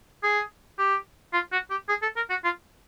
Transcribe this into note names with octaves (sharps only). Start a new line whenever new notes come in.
G#4
G4
F4
F#4
G4
G#4
A4
A#4
F#4
F4